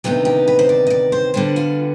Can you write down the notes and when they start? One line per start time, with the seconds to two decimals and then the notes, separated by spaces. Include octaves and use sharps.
0.04 D2 C3 D#3 B3 D#4 F4
0.25 G4
0.48 B4
0.59 C5
0.69 D5
0.87 D#5
0.90 D5
1.12 C5
1.34 D3 G3 B3 C5
1.56 F4